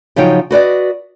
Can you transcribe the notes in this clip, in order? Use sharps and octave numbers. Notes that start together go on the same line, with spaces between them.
C#3 F3 F#3 D#4 C#5 G5
F#4 B4 D5 D#5